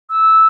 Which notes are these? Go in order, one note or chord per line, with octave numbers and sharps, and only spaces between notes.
E6